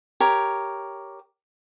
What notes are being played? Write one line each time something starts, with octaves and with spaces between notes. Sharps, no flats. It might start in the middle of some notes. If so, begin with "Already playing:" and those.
G4 A#4 C#5